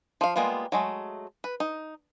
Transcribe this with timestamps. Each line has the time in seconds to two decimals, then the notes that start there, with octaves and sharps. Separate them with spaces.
0.21 F3 F5
0.36 G3 G#3 A#3 B3 F4
0.72 F#3 G#3 A3
1.44 B4
1.60 D#4